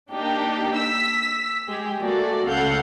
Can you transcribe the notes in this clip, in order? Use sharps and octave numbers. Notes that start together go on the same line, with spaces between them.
A#3 D4 D#4 G4
E6 B6
G#3 G4 G#4
A3 A#3 F#4 A4 D5
C#2 C#3 A4 F5 F#5 G6